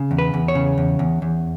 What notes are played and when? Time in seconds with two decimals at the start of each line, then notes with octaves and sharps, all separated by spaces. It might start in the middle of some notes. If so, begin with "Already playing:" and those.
Already playing: C#3
0.11 E2
0.19 B4
0.34 E2
0.48 C#5
0.55 C#3
0.78 E2
0.99 E2
1.22 E2